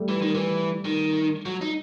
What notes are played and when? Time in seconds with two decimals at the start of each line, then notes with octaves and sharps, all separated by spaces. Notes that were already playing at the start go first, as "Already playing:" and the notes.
Already playing: G3 A3
0.09 E3
0.22 D#3
0.35 E3
0.85 D#3
1.46 F#3
1.61 D#4